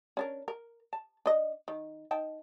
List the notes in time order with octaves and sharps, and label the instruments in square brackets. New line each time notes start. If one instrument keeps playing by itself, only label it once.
[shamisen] C#4 D4 A#4
A#4
A5
D4 D#5
D#3
D#4 G5 A5